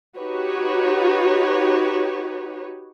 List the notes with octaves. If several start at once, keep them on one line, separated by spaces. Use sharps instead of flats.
D#4 F#4 G4 B4 C#5